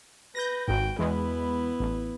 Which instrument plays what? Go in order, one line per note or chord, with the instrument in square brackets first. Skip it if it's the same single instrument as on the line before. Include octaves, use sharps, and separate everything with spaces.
[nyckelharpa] B4 [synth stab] G6 A#6
[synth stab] G#1 G#2 [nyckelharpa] F#4 G5
[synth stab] E2 G#3 [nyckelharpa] B3 E4
[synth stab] A1